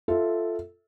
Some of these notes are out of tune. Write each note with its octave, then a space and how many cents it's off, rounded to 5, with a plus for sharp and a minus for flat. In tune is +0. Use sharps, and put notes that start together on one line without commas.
F4 -5 A4 +0 E5 -15